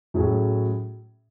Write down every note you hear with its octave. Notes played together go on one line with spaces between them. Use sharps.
A2 F#3 C#4 G#4